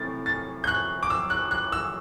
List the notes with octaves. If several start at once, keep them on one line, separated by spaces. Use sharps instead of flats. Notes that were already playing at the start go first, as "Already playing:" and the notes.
Already playing: C3 E3 A3 E4 A6
A6
G6
F#6
D6
E6
F#6
F#6
E6